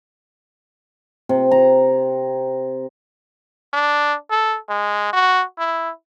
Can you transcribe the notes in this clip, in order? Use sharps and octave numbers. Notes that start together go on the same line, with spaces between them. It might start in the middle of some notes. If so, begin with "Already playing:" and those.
C3
A#5
D4
A4
G#3
F#4
E4